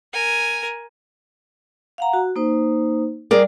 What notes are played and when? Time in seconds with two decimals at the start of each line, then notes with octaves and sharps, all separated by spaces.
0.13 A#4 G#5
1.98 F5 F#5 A#5
2.13 F#4
2.36 A#3 D#4 C5
3.31 G3 G#4 A#4 D5